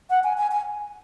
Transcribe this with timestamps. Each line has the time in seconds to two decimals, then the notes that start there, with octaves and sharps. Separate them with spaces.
0.10 F#5
0.24 G#5
0.38 G#5
0.51 G#5